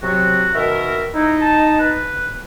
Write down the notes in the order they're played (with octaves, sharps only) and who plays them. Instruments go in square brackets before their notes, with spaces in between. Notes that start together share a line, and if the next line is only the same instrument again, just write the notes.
[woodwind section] C3 F#3 [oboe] F#4
[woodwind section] B2 D#3 A#4 [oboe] E5
[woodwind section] D#4 [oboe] E4
[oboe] A5
B4